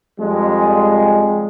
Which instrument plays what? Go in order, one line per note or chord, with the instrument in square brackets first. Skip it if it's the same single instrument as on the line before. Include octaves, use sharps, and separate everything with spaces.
[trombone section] F2 G3 G#3